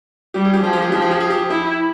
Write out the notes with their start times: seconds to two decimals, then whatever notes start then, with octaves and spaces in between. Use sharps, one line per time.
0.34 G3 G4
0.45 G#4
0.54 G4
0.63 F3 G#4
0.73 G4
0.82 G#4
0.92 F3 G4
1.02 G#4
1.11 G4
1.20 G#4
1.30 G4
1.50 E4 G4